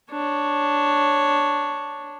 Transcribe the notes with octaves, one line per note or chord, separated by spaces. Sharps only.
D4 C#5